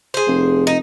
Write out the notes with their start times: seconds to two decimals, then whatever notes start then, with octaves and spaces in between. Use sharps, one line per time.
0.14 G#4 C5
0.28 F1
0.67 D#4